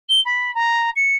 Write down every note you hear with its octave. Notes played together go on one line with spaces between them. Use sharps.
G7
B5
A#5
C#7